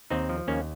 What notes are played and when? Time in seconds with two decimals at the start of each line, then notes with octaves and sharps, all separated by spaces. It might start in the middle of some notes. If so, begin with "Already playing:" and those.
0.10 D#2 C4 D#4
0.29 F3
0.48 D#2 A#3 C#4